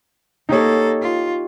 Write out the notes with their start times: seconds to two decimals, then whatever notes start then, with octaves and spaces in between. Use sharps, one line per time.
0.49 A#3 D#4 G4 A4 C#5
1.02 F4